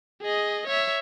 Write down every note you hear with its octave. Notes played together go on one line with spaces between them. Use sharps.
G#4 D#5
C#5 E5